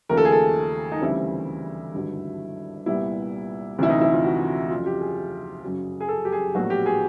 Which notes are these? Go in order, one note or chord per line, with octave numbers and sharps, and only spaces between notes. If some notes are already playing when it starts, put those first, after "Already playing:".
D#2 C#3 F3 A3 A#4
A4
G#4
A4
D#4
D2 C#3 E3 G3 C4 E4
G#1 G2 D3 F#3
C2 A#2 G3 B3 E4
D2 C3 E3 E4
D#4
E4
F4
F#4
F2 C#3 F#3 F4
G4
G#4
F#2 C#3 F#3
G#4
A4
G4
G#4
A#1 A2 F#3 B3 F#4
G4
G#4